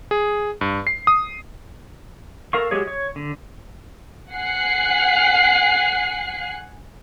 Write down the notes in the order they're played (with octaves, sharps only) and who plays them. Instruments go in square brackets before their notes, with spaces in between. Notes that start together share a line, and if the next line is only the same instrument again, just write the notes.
[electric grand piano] G#4
G2
C7
D#6
[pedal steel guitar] A4 A#4 F5 C#6
F#3 G#3 G4 G#4 C#5
C#5
D3
[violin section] F#5 G#5 F#6 C7